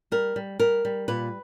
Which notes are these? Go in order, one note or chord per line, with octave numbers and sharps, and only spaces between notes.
G3 A#4
G3
G3 A#4
G3
A#2 B4